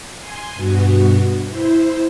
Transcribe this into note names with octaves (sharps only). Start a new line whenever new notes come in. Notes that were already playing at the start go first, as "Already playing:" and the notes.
G#5 C6
G2 B2 B3 F#4
E4 C5